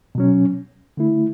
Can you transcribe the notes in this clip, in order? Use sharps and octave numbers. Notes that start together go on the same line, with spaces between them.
B2 F#3 C#4
D3 A3 E4